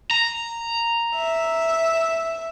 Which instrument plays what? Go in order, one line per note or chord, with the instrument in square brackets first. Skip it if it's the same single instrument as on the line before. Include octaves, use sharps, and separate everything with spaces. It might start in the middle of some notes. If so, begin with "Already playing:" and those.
[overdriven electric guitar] A#5
[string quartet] E5